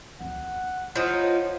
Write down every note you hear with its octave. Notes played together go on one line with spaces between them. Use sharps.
D2 F#5
F3 D#4 C#5